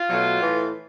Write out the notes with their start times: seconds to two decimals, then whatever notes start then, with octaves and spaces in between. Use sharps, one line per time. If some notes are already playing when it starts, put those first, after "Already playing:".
Already playing: F4
0.08 B2 F#3 A3
0.40 A2 E3 A3